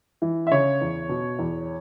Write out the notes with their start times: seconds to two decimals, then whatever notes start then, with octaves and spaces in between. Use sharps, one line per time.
0.22 E3
0.47 E5
0.52 C#3 C#5
0.81 E2
1.09 B2
1.39 E2